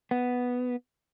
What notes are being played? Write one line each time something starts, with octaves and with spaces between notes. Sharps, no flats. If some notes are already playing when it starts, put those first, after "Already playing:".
B3